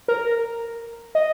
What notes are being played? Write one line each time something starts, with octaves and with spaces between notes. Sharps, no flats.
A#4
D#5